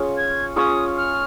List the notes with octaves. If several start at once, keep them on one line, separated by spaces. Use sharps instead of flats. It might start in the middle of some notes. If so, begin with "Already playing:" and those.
Already playing: C#4 F4 G#4 C#5
G#6
C#4 F4 G#4 C#5 D#6
F6